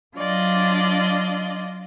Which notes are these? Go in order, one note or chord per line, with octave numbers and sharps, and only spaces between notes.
F#3 D4 F4 D5 D#5